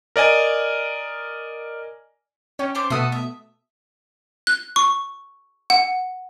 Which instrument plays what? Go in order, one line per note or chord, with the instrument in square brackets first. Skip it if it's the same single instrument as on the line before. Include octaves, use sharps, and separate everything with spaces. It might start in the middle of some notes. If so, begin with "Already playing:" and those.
[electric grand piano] A#4 D5 D#5 G#5
[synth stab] C#4 [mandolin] G4
[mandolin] A3 C5 D6
[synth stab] B2 A3 D#6 [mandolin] F#4 A4
[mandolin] E5
[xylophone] F#6
C#6
F#5